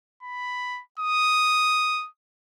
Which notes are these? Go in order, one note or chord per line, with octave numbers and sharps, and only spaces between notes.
B5
D#6